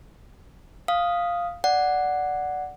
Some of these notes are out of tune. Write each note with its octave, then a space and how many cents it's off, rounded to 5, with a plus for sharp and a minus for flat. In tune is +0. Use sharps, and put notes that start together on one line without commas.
F5 +0 D#6 +0
D5 +0 F#5 +0